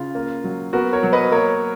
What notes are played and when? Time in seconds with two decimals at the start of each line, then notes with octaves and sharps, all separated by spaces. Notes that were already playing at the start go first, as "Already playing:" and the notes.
Already playing: C#3 F4
0.15 A#3
0.44 F#3
0.73 B3 F#4 A#4
0.93 A#4 C#5
1.03 F#3
1.13 B4 D#5
1.32 A#3 A#4 C#5